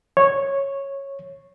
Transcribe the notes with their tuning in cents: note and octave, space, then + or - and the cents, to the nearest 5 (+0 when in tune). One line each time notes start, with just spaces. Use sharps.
C#5 -10